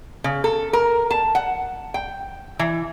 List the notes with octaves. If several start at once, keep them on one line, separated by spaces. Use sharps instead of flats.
C#3
A4
A#4
A5
F#5
G5
E3